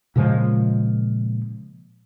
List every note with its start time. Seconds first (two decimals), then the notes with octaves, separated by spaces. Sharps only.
0.16 A#2 C#3 F3 G#3